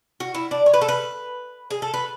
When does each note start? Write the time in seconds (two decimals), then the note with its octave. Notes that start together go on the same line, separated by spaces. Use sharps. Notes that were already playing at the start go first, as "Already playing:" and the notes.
0.20 F#4
0.35 E4
0.51 D4
0.66 C#5
0.74 B4
0.81 A4
0.88 B4
1.71 G#4
1.82 A4
1.94 B4